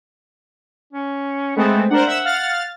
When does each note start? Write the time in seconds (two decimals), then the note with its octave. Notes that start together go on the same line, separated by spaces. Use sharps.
0.93 C#4
1.56 G#3 A3 B3 C4
1.91 D4 A#4 C5 F#5
2.07 E5 E6
2.24 F5 F6 A6